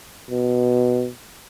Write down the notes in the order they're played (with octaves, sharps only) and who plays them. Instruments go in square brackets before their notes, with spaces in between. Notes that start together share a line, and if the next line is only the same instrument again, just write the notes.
[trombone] B2